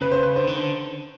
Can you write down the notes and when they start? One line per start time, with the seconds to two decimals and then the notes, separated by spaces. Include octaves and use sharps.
0.01 C#3 B4
0.12 C5
0.23 B4
0.36 D3 C5
0.47 D#3
0.58 D3